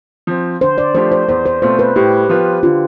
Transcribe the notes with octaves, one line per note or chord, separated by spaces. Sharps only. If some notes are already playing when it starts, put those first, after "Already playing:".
F3 C4
D3 C5
D5
F3 A3 D4 G4 C5
C5
E2 C5
C5
B2 A3 C4 F4 C5
B4
A2 G4
F3 B3 F4 B4
D3 F4